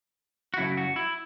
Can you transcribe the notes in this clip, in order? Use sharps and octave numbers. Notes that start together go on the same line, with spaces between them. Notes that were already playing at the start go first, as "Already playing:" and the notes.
F#4
F#2 C#3 F#3 A3 E4
F#4
E4